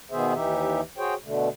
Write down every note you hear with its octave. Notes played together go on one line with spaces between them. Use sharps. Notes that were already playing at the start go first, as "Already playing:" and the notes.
B2 D#3 B3 G#4 C5 E5
D#2 E3 D#4 G4 E5
F#4 G#4 C5 C#5 G5
B2 D3 A3